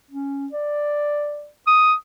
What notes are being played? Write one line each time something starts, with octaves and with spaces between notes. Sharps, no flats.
C#4
D5
D#6